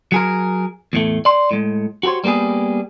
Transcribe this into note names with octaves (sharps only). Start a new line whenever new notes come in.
F#3 G#4 A#4
E2 A2 A3
D5 C6
A2 G#3
F#4 G4 A#4 C5 C#5
G3 A#3 B3 G4 G#4